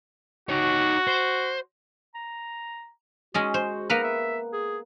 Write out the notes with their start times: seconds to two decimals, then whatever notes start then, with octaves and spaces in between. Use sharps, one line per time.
0.49 D#4 F#4 C#5
1.07 C5
2.15 A#5
3.34 G#3 C#4 F#4 D#5
3.54 C5
3.90 A#3 B3 B4 A#5
4.04 E5
4.53 G#4